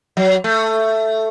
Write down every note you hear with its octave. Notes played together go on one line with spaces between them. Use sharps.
F#3
A3